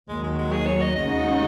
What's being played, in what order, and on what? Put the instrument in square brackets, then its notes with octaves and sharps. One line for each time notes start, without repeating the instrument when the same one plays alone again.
[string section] D#2 D#3 F#3 [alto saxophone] G#3
[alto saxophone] G#3
G#3
G#4
C#5
D#5
[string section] D#2 C#3 G#3 D#4 F#4 [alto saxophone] D#5